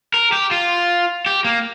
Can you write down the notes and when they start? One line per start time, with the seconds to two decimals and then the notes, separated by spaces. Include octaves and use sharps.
0.14 A#4
0.32 G4
0.51 F4
1.26 G4
1.45 A#3